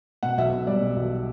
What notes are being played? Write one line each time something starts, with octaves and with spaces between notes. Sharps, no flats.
B2 F#5
B1 E5
B1
G3 D5
B2
B1